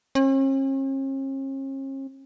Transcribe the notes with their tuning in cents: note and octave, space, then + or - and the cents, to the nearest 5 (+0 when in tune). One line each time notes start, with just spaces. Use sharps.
C#4 -45